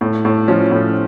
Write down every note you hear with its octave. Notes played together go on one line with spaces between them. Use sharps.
A2
A2
F3 C#4
A2